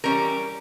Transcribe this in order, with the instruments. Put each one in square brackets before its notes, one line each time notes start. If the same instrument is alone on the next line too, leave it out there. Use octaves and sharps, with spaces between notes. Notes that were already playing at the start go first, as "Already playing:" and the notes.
[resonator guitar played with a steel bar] E3 G3 C#4 A#4